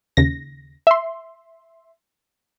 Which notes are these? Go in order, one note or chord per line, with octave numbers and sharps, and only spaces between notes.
D#2 C#3 A#6
E5 C6